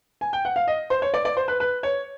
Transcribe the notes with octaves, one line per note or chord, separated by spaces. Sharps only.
G#5
G5
F#5
F5
D#5
C5
C#5
D5
D5
C5
B4
B4
C#5